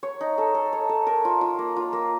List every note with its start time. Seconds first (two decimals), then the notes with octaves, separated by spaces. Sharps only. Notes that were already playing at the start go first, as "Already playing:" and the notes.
0.03 C#5
0.21 D#4
0.38 A4
0.54 A4
0.73 C#5
0.89 A4
1.07 A#4
1.25 F4
1.41 F4
1.59 A#3
1.76 F4
1.93 A#3